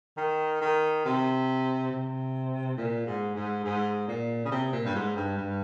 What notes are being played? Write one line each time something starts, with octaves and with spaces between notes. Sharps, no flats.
D#3
D#3
C3
C3
A#2
G#2
G#2
G#2
A#2
C#3
C3
A#2
G2
G#2
G2
G2